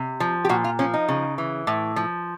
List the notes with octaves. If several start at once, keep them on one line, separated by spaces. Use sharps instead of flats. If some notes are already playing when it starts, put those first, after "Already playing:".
Already playing: C3
F3
G4
A#2 F#4
F4
F3 C#4
D#4
C#3
E3
A2
F3